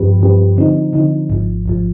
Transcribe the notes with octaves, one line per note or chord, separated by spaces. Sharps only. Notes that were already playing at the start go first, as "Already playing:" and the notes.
Already playing: G2 F3 C4 G4 B4
G2 F3 C4 G4 B4
D3 F3 C4 D#4
D3 F3 C4 D#4
G#1 G#2 F3
G#1 G#2 F3